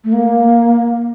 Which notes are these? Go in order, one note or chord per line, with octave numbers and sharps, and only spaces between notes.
A3
A#3